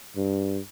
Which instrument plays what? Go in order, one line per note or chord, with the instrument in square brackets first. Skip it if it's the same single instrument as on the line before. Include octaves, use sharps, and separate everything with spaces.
[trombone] G2